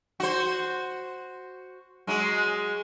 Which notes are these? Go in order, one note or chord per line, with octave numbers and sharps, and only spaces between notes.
F#4 C5
F#3 G#3